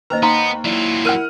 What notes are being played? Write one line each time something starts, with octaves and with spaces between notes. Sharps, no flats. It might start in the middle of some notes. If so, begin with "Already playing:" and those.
D#2 B4 C5 D#5 A#5
B3 D#4 F5 A#5 C6
F#3 E4 F4 D5
A#4 F#5 F6 D#7